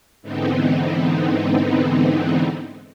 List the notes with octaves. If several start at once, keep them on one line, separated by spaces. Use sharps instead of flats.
G#2 D3 E3 B3 C4 D#4